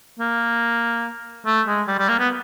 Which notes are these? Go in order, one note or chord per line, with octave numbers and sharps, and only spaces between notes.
A#3
A3
G#3
G3
G3
A#3
B3